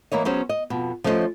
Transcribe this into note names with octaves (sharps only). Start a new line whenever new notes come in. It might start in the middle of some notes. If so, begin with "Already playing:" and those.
E3 A#3 E4 C#5 D#5
F#3 B3 C#4 G#4 C5
D#5
F2 B2
F3 A3 C#4 E4 C5 D#5